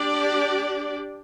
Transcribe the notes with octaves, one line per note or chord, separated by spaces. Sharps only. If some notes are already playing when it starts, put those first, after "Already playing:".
Already playing: D4 G4 D5